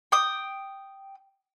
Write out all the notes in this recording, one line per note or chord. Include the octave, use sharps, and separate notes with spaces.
G5 D#6